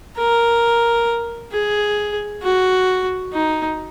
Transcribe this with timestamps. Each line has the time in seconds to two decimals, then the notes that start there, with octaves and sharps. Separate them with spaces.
0.17 A#4
1.52 G#4
2.43 F#4
3.33 D#4